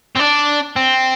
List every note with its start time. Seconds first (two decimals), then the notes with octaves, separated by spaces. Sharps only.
0.17 C4
0.20 D4
0.76 C4